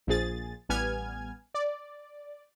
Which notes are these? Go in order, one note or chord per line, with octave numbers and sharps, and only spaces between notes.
A#1 A#2 F3 G#4 A6
A1 G3 B3 G#5 F6 G#6
D5